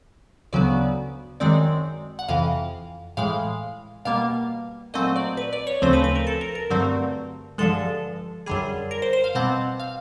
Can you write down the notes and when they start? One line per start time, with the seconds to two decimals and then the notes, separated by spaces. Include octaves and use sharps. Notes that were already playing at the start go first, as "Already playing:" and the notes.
0.53 D2 C#3 F#3 B3 D5
1.40 F#2 D#3 G#3 C4 D5
2.19 F#5
2.29 F2 C3 E3 F5
3.17 A2 E3 G#3 F5
4.05 B2 G3 A#3 F5
4.94 A#2 F#3 A3 C4 D#5
5.16 D5
5.37 B4
5.53 D5
5.67 C#5
5.82 D2 C#3 F3 A3 C4 C5
5.93 B4
6.04 B4
6.16 A#4
6.27 A4
6.41 A#4
6.55 A#4
6.70 G2 D3 F#3 A3 C4
7.58 G2 D3 F3 G#3 A4
8.46 F#2 D3 G3 G#4
8.91 A#4
9.02 C5
9.13 C5
9.24 F5
9.35 B2 G3 C4 F#5
9.80 F5